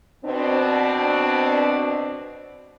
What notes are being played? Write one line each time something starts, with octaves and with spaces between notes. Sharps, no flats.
B2 C4 D4